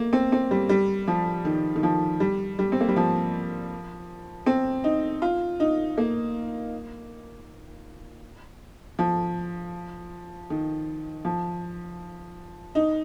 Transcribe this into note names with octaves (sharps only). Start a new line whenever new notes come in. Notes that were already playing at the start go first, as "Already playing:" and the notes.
Already playing: A#3
C4
C4
G3
G3
F3
D#3
D#3
F3
G3
G3
C4
A#3
G3
F3
C4
D#4
F4
D#4
A#3
F3
D#3
F3
D#4